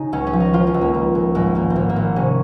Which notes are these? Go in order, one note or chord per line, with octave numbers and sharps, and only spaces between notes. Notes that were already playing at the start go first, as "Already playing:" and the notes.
Already playing: C#3 D#4
C#2 C#4
C#4
F3
D#4
F3 F4
C#4
C#2
A#3
C#2
C#2
G#1 G#3
G#1 A#3
C4
G#1 A#3
A#3
G#1
C3 C#4